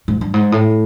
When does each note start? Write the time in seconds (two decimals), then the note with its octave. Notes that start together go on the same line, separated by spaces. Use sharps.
0.08 G#2
0.21 G2
0.34 G#2
0.52 A2